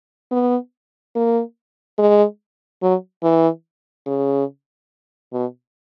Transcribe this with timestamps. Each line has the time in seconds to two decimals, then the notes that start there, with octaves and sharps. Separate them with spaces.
0.31 B3
1.16 A#3
1.98 G#3
2.82 F#3
3.23 E3
4.07 C#3
5.33 B2